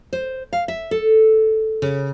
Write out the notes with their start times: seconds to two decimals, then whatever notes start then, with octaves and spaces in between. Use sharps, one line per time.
0.13 C5
0.53 F5
0.68 E5
0.91 A4
1.82 C#3